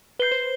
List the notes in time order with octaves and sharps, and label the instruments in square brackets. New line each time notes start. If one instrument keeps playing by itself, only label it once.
[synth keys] B4 [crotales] G6 C7 G7
[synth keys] C5